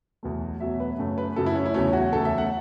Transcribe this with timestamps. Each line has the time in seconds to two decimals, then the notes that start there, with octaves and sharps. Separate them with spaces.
0.23 E2 B2 F#3 A3
0.60 E2 B2 F#3 A3 E5
0.80 B4
0.98 F#2 C#3 F#3 A3
1.18 B4
1.36 F#2 C#3 F#3 A3 A4
1.46 E4
1.55 C#4
1.66 E4
1.74 E2 C#3 F#3 A3 C#4
1.93 F#4
2.12 E2 C#3 F#3 A3 A4
2.25 E5
2.38 F#5